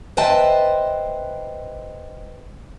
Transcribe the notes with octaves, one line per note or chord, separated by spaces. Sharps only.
B4 C5 D#5 E5 G5 A5